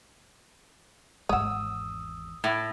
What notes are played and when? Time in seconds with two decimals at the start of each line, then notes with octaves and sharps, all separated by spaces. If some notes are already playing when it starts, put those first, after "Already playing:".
1.29 G#1 E2 C#5 F#5 D#6 E6
2.44 A2